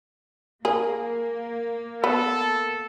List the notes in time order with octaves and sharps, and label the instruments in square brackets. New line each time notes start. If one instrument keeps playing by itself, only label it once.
[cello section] A#3 [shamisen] G#4 [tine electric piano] A#4
[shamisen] B3 [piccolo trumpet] A4